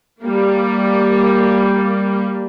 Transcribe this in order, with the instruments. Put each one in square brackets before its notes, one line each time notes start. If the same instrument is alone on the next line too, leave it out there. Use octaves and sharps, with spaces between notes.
[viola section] G3 A#3